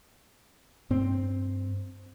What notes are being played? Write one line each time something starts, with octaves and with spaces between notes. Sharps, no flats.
G2 C4